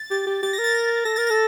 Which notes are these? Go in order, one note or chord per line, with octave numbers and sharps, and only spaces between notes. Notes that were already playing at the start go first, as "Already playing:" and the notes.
Already playing: A6
G4 A6
G4
G4 A6
A#6
A#4
A6
A#6
A4 A#6
A#4 A6
A#6
A4